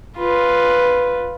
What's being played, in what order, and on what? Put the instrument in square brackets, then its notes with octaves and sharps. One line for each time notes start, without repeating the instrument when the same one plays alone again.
[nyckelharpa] F4 B4